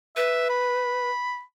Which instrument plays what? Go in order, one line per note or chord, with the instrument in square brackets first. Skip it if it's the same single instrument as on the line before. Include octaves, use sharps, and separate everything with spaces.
[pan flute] B4 [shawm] E5
[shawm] B5